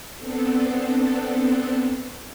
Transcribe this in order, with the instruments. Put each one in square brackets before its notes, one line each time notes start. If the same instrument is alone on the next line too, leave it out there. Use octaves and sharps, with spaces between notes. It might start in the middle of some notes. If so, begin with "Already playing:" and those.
[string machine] B3 C4 D4 A4